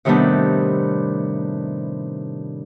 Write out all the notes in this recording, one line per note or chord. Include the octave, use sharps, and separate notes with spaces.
A2 C3 D#3 G3 B3 D4